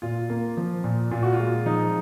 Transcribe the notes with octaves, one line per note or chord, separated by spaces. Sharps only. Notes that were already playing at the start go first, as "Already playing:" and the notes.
A#2 F4
A#3
F3
A#2
A#2 F4
F#4
F4
G#3
F3 D#4